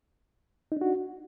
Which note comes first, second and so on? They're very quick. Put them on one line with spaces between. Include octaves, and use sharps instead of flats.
D#4 D4 F#4